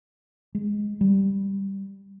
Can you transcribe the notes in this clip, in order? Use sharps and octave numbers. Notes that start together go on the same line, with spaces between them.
G#3
G3